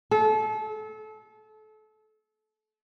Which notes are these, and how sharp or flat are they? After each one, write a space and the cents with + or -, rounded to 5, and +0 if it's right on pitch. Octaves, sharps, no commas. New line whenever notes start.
A4 -30